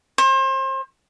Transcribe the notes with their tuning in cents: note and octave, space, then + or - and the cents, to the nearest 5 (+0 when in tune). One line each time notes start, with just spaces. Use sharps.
C5 +35